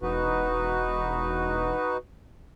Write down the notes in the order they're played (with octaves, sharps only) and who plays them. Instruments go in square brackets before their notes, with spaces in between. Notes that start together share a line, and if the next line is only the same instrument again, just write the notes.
[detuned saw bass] E1 [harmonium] D#4 F#4 B4